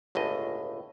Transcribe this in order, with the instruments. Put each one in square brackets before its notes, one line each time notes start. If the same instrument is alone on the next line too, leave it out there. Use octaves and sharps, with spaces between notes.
[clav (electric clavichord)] G1 C#2 A2 D#5